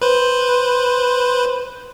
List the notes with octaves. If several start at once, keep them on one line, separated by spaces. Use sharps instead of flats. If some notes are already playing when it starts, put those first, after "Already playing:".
B4 C5